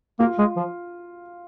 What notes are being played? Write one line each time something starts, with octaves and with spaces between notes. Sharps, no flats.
A#3 F4
G#3
F3